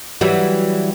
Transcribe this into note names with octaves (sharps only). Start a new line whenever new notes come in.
E3 F#3 G3